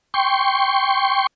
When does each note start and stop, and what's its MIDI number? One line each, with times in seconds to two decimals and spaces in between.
0.14 1.27 79
0.14 1.27 84
0.14 1.27 85